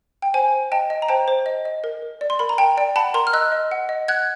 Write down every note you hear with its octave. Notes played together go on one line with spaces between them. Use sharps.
G5
C5 G#5
C5
D#5 G5 A5
D#5
A#5
C5 G5 A5
C5
D#5
D#5
A#4
A#4
D5
C6
A#4 B5
A#5
A#4 G5 A5
D5 G5
F#5 A5 B5
A#4 A#5 C6
F6
D#5 E6 F#6
D#5
F#5
D#5
F#5 F#6 G#6